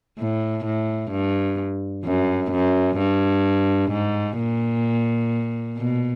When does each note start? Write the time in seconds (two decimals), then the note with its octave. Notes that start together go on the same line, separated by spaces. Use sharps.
0.18 A2
0.65 A2
1.11 G2
2.05 F#2
2.52 F#2
2.98 G2
3.92 G#2
4.38 A#2
5.78 B2